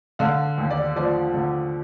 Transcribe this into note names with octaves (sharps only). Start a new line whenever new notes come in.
D3 F5
D#2
D5
F3 D5
D3